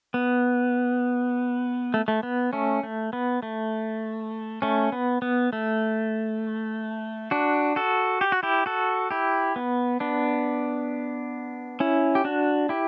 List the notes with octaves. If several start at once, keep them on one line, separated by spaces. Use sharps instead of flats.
B3
A3
A3
B3
A3 C#4
A3
B3
A3
A3 C#4
B3
B3
A3
D4 F#4
F#4 A4
G4
F#4
E4 G4
F#4 A4
E4 G4
B3
B3 D4
C#4 E4
G4
D4 F#4
E4 G4